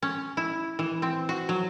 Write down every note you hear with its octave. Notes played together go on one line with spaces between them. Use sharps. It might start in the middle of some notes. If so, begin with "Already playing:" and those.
C#4
E4
E3
C4
F#4
F#3